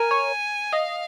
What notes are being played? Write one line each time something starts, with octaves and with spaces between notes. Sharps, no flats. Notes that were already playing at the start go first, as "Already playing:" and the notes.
Already playing: A#4 G#5
C#5
D#5 F5